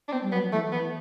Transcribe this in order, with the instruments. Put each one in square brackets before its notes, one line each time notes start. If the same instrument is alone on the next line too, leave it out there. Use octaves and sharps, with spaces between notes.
[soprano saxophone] D4
[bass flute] B3 [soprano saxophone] C4
[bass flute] G3
[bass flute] F#3 [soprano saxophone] B3
[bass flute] F#3
[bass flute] E3 [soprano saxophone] A3
[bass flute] E3 [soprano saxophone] B3